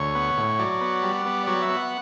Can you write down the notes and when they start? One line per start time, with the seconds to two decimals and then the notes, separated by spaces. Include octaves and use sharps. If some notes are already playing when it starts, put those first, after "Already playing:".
Already playing: D2 C#5
0.15 B3
0.37 A2
0.59 F#3 D5
0.81 B3
1.03 G3
1.25 B3
1.47 F#3 D5
1.62 E5
1.69 B3
1.77 F#5